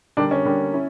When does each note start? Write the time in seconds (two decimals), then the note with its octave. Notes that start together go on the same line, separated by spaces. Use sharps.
0.17 D3 G3 A#3 D4
0.31 C#4
0.45 D3 G3 A#3
0.74 C#4 E4